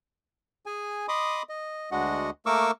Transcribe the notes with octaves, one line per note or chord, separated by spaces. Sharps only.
G#4 G#5
D#5 B5 C6 D6 D#6
D#5
D2 G#3 D4 F#4 D#5 F#5
A3 A#3 A#4 C#6 D6 E6